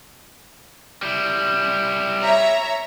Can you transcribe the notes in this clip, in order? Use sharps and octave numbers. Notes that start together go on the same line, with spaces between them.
G3 E4
C#5 E5 A#5